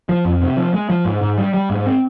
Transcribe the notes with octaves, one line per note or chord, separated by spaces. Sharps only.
F3
F2
C3
F3
G#3
F3
G#2
G#2
G3
G3
G#2
C4